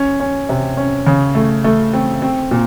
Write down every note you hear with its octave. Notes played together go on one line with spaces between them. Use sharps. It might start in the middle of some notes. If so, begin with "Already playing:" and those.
Already playing: C#4
C#4
C3
C#4
C#3
A3
A3
C4
C4
A#2